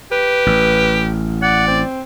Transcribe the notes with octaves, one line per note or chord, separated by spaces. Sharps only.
G4 B4
A1
D5 F#5
C4